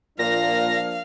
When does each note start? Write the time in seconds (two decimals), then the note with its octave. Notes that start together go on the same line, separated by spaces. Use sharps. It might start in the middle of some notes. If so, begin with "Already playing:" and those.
0.19 A#2 F3 A#3 D4 F5 A#6